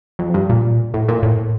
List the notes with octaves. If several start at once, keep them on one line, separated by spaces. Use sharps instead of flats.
F2
G2
A#2
A2
A#2
A2